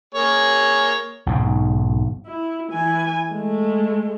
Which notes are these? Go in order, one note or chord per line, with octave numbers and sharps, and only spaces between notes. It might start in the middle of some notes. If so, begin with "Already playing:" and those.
A#3 G#4 C#5
B1 G#2 C#3
E4
E3 G#5
G#3 A3